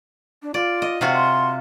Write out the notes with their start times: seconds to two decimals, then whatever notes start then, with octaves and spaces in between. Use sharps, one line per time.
0.42 D4
0.54 F4 D5
0.82 D#5
1.01 C3 F4 F#4
1.15 C6